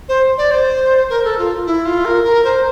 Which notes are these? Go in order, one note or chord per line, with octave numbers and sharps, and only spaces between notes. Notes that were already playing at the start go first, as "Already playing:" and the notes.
C5
D5
C5
A#4
A4
F4
E4
F4
A#4
A#4
C5